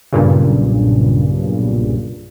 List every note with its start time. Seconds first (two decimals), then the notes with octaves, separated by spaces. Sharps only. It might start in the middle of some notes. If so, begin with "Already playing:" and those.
0.13 B1 G2 A#2 C#3